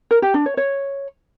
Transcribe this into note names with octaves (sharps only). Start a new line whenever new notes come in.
A#4
G4
D4
C#5
C#5